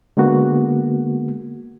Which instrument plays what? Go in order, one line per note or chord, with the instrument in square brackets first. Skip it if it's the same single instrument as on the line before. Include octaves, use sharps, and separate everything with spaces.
[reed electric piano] D3 G#3 A#3 B3 F#4